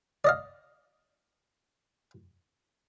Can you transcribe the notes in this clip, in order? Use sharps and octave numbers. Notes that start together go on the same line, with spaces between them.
D5 D#5 F5